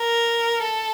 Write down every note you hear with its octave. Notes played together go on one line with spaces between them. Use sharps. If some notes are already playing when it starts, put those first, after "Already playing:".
Already playing: A#4
A4